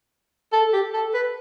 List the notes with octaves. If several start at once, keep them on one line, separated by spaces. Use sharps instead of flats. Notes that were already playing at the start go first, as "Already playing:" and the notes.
A4
G4
A4
B4